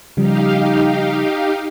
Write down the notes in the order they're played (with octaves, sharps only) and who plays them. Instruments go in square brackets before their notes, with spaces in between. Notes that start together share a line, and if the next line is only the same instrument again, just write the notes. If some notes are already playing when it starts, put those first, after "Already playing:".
[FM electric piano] C#3 F3 G3 [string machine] D#4 G4 F5